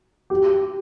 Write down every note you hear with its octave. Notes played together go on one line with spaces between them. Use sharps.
G4